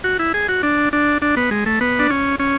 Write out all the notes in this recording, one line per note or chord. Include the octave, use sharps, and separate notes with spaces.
F#4
E4
G#4
F#4
D4
D4
D4
B3
G#3
A3
B3
D4
C#4
C#4